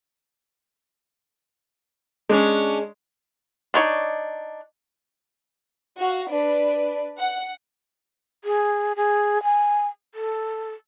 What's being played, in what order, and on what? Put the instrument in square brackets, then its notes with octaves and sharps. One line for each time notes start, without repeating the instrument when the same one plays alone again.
[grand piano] G#3 [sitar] C#4 D4
[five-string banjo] D4 D#4 C#5
[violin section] F#4 F5 F#5
D4 B4 D5
F#5
[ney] G#4
G#4
G#5
A4